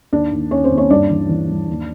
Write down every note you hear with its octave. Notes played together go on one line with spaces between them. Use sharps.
D#2 D4 D5
D#2
D#2 C#4 C#5
C4 C5
D#2
C#4 C#5
G2 D4 D5
E3
E3
G2
D#2